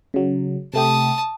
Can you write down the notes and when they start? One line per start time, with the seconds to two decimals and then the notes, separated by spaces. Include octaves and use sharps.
0.14 C#3 F#3
0.74 C3 A3 G4 A5 D#6